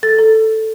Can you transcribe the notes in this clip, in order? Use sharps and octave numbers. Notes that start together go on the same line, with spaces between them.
A4 A6
A4